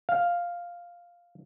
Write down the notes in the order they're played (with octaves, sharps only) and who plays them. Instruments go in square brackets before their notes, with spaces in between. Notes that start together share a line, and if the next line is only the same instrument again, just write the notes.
[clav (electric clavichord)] F5